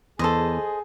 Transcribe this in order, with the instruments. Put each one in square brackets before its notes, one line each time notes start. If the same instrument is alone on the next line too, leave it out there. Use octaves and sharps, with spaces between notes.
[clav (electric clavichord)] E2 [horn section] G#4 [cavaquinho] A4 C5 D#5